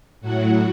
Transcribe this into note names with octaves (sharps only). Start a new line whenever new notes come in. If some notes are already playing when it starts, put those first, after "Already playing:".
A2 F#3 F#4